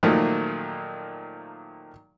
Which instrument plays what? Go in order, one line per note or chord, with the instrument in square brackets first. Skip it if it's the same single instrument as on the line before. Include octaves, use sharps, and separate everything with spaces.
[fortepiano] A#2 D#3 F3 F#3 A3 A#3